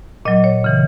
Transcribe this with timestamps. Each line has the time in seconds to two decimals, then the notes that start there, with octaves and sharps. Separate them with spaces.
0.25 A#2 F#3 D#5
0.44 C#5
0.64 C#3 E3